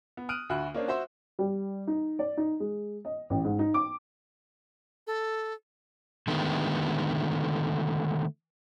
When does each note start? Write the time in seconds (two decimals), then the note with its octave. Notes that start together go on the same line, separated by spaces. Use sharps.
0.17 B3
0.29 D#6 F6 F#6 D7 D#7
0.50 D2 F#4 B5 F#6
0.74 A#3 C#4 D4 C5
0.88 F#4 C5 E5 C6
1.39 G3
1.87 D#4
2.19 D5
2.37 D#4
2.60 G#3
3.05 D#5
3.30 A1
3.44 G#2
3.59 D#4
3.74 D6
5.07 A4
6.28 D3 D#3 G#3 A3 B3